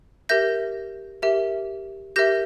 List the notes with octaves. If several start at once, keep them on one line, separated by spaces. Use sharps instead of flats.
G4 A#4 E5 G6 A#6
G4 A#4 E5
G4 A#4 E5 G6 A#6